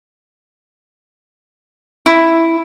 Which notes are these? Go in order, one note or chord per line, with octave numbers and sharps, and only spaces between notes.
E4